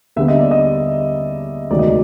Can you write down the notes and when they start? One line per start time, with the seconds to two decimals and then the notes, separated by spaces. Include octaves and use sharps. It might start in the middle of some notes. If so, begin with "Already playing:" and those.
0.16 D#2 D3 G3 B3 E5
0.28 D#5
0.40 D5
0.51 D#5
1.70 E1 D2 C3 D#3 F#3 D5
1.79 D#5
1.87 D5